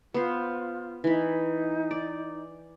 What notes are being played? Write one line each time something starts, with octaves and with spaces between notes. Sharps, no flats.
B3 F4 C5
E3 D#4 B5
D5